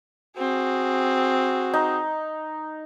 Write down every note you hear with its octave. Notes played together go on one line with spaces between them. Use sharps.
C4 F#4 G#4
D#4